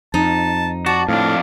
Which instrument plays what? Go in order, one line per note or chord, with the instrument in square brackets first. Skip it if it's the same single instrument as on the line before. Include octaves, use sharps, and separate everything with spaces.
[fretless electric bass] F2 [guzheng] D#4 [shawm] A5
[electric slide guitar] F#4 [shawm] D5 [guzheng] A5
[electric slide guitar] F2 D4 [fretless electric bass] A2 [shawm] F5